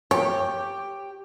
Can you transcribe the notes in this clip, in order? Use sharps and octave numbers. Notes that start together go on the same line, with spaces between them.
G4 C#5